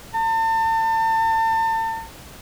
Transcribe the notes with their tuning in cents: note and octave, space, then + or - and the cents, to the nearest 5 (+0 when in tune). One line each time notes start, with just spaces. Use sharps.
A5 +35